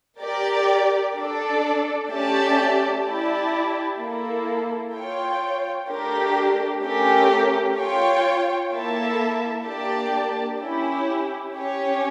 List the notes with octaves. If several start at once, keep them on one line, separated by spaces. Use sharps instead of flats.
G4 A#4 D5
D4 A4 D5
A3 C#4 G4 D5 A5
E4 G4 D5 A5
A#3 E4 A4
F4 C#5 G5
A3 D4 G4 A#4
A3 C#4 G4 A#4
F4 C#5 G5
A#3 E4 A4 E5 A5
A#3 D4 G4 D5 A5
C#4 E4 G4
C#4 G4 C#5